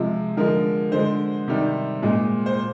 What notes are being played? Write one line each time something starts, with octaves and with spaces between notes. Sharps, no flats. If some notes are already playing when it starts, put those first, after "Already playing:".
Already playing: C3 F3 G#3
D3 F3 G#3 A#4
D3 G#3 C5
C3 D#3 G3
A#2 G#3
C5